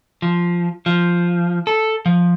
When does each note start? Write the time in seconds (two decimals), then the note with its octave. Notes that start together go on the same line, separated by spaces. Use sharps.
0.22 F3
0.86 F3
1.67 A4
2.06 F3